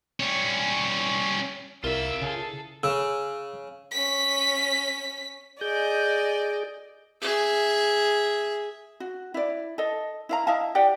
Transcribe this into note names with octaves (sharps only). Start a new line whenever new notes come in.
G3 C#4
C2 E4 F4 A#4 E5 E6
C#3 G#4 A4
C#3 E6
C#4 B6
G#4 D5 D#5 G6
G#4 E5
F#4
E4 D5
A4 D#5
E4 F5 A#5
E4 D#5 F5 A5
G4 D5 F#5